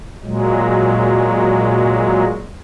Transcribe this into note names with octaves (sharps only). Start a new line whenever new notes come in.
A#2 F#3 G#3